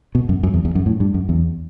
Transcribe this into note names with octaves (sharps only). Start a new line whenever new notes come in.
B2
F#2
F#2
E2
E2
F#2
A2
G2
F#2
E2